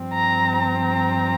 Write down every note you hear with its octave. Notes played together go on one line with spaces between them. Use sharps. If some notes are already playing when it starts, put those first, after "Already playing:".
Already playing: G2 F3 C4
A#5
A#5